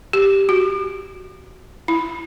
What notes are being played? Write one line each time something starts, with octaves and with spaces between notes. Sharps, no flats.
G4
F#4
E4